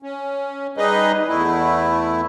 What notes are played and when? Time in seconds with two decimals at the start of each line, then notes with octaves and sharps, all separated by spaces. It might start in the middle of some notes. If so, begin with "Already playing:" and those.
0.02 C#4
0.77 G3 D#4 G#4 B4 D#5
1.29 E2 A3 E4